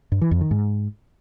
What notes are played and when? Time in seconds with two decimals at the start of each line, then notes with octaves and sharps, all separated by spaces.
0.12 G2
0.21 E3
0.31 F2
0.41 D#3
0.51 G#2